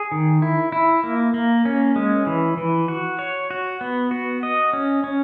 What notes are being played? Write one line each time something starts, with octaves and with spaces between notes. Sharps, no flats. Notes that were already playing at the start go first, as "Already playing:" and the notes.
Already playing: G#4
D#3
E4
E4
A#3
A#3
C#4
G#3
E3
E3
F#4
C#5
F#4
B3
F#4
D#5
C#4
C#4